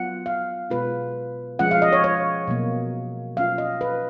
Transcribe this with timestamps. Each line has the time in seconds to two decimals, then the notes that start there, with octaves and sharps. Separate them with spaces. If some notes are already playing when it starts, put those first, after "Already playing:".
Already playing: F#3 B3 F4 F#5
0.26 F5
0.70 B2 G#3 B3 F4 B4
1.59 F3 G#3 C#4 F4 F#5
1.71 F5
1.82 D#5
1.93 C#5
2.04 C#5
2.47 B2 F#3 A#3
3.37 F#3 C#4 F4 F5
3.58 D#5
3.81 B4